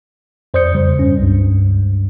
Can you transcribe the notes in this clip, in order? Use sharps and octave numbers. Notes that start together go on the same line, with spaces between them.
F2 C5 D5 D#6 G6 C#7
E2 C#3 G3
G2 C#4
C#2 G2